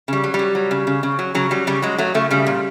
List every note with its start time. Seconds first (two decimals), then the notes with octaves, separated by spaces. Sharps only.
0.08 C#3 G3
0.24 F#3
0.34 G3
0.39 F#3
0.55 F#3
0.71 C#3
0.87 C#3
1.03 C#3
1.19 F#3
1.34 C#3 F#3
1.51 F#3 G3
1.67 C#3 G3
1.82 F#3 G#3
1.98 F#3 A3
2.15 C#3 A3
2.30 C#3 G3
2.46 A#2